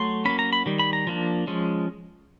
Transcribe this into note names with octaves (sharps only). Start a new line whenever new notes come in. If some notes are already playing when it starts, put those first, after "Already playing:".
Already playing: F#3 A3 C6
F#3 A#3 C#4 B5
A#5
B5
D#3 G3
B5
A#5
F3 A#3 D4
F3 G#3 C#4